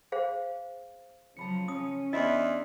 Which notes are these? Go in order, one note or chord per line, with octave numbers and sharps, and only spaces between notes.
G#4 C5 F5
C#3 F3 F#3 A5 B5 C#7
C#4 D#6
E2 D4 E4 D5 D#5 C6